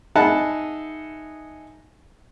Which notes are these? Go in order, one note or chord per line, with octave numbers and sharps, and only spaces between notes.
D#4 G#4 E5 F#5 A5 B5